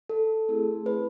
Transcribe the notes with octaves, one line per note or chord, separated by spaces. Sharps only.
A4
A3 C4 E4 G#4
B4